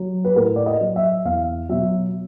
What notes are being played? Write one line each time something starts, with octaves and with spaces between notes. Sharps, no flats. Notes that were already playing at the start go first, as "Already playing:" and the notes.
Already playing: F#3
B4
A2 A#4
D5
D#5
F#3
E5
E2 F5
B2 F#3 E5